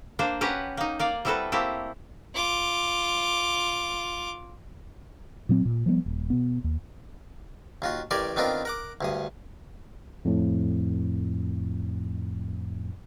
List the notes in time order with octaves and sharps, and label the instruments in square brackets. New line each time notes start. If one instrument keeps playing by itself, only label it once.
[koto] A#3 D4 C5
C#4 G4 B4 F#5 A#5
A#3 D#4
A#3 D5 F5
G3 C4 E4 F#4 A4 B4
A3 A#3 C4 E4 G4
[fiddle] F4 D6
[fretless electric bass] A#2 F#3 C4
A#2
F3 G3 G#3 B3
D#1
B2 B3
D#2
[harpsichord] D#2 F4 F#4
A1 G4 A#4 D5 G#5 C6
D#3 B3 C4 D4 F4 A#4
A#4 F#5 D6
D2 G2 D#6
[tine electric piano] F2 A2